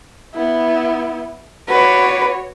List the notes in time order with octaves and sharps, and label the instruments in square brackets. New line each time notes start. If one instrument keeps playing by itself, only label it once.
[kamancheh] B3 E4
[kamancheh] F#4 C#5 [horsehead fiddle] B4 D5